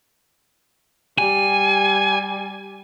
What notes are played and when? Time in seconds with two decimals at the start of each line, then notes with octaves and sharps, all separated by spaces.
1.18 G3 G#5